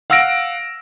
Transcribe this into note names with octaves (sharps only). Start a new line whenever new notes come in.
F5 F#5 E6 F6 A#6 D7